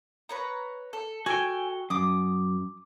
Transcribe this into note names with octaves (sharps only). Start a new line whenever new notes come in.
B4 C#5 A#5
A4
F#4 A4 G5 G#5
F#2 D6 D#6